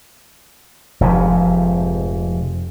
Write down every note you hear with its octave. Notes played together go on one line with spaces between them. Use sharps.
F1 G#2 C3 F3